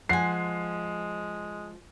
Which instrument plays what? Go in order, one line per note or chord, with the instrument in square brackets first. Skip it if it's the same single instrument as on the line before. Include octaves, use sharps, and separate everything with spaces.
[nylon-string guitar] F3 [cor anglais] G#3 [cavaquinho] F#5 G#5 [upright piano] C7